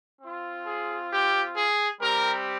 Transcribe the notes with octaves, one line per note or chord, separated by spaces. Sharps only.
C4 F4
G#4
G4
G#4
G3 C4 G4 A#4